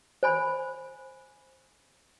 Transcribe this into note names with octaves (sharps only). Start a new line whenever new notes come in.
C5 G#5 B5